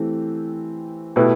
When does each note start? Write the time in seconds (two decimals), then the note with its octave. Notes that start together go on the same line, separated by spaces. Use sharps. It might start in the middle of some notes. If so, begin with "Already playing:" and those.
Already playing: E3 A3 C4 G4
1.16 B2 A3 E4 G4 B4